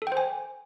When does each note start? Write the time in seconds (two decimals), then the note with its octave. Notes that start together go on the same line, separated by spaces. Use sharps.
0.02 A4
0.07 G5
0.12 C5
0.17 G#5